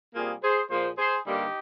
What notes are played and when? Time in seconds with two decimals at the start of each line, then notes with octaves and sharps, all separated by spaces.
0.14 C3 G3 A#3 F4 G#4
0.42 G#4 C5
0.69 A#2 F3 A#3 G#4 C5
0.98 G#4 C5
1.25 G2 D3 G3 A#3 D#4 G4